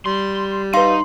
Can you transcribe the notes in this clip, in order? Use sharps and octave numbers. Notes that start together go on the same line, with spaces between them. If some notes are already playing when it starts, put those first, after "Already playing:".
G3 C6
D#4 B4 F5 C6